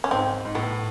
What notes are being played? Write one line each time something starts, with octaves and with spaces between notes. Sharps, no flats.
C#4
G#2 C4
G#2
A2 B3